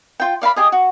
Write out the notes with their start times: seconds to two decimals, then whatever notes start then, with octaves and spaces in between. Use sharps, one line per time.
0.20 F4 G5
0.42 D5 F5 A5 B5
0.56 G4 G#4 D#5
0.72 F#4